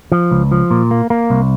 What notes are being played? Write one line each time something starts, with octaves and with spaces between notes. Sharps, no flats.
F3
C#2
F3
A#2
A#3
A#3
C2